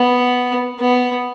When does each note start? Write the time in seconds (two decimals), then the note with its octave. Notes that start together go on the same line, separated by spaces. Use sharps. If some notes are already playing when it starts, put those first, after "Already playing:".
Already playing: B3
0.80 B3